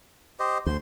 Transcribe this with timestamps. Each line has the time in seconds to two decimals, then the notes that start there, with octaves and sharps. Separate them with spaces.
0.40 G4 C5 D#5
0.66 D2 C5 C6